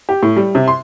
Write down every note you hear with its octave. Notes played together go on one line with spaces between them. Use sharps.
G4
A2
G3
C3
C6